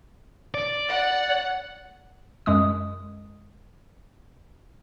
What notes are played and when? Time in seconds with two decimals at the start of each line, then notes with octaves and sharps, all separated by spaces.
0.54 D5
0.89 F#5
2.46 F#2 G#3 D#6